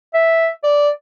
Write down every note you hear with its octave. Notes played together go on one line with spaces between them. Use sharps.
E5
D5